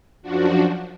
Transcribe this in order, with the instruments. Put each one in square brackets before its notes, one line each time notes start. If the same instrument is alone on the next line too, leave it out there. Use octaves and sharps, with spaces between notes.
[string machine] F#2 F3 D4 F#4